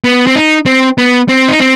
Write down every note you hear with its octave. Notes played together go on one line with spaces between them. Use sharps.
B3
C4
D#4
C4
B3
C4
D#4
C4